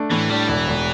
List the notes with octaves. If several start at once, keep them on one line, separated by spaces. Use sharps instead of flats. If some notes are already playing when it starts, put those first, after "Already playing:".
Already playing: A3 D4
A2 E3
G3 D4
E1 E3
E1